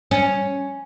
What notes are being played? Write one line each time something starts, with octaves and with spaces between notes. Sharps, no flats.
C#4